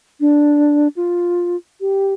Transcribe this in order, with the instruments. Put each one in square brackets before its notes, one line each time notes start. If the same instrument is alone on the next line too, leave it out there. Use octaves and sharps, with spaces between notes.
[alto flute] D4
F4
G4